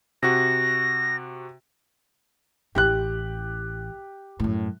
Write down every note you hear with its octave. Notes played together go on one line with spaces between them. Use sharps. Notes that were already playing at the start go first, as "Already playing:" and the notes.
C3 F#4 A#6
A1 E4 G4 F#6
F#2 A2